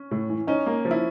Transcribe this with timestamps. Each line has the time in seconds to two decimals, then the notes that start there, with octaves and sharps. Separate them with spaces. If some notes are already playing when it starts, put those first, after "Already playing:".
Already playing: C#4
0.11 A2
0.29 E3
0.47 C#4 D#4
0.66 A#3
0.85 F3
0.91 E4